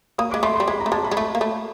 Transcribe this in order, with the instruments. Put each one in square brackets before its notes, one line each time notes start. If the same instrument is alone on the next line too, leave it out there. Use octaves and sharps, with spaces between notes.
[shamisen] A#3 [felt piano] D#6
[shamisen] G#3 [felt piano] D6
[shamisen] A3 [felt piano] C6
[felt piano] C6
[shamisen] G3
[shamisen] G#3 [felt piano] B5
[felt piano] A#5
[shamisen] A3
[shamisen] G#3 [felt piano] A5
[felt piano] B5
[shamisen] G#3
A3
A#3
A3